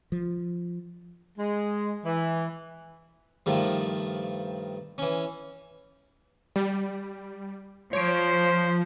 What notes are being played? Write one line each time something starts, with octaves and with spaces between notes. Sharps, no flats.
F3
G#3
E3
G2 D#3 F3 A3
E3 C#4
G3
F3 C5 C#5 D7